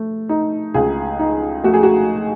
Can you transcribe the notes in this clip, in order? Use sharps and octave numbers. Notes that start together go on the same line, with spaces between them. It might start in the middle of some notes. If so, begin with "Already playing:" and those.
Already playing: A3
D#4
C#2 G#4
D#4
A3 F#4
G#4
F#4